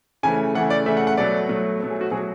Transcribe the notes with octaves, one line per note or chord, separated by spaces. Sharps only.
C#3 E3 A3 G#5
C#3 E3 A3 F#5
D5
C#3 E3 A3 E5
F#5
F#5
B2 F#3 A3 D5
B2 F#3 A3
B2 F#3 A3
G#4
F#4
B2 F#3 A3 G#4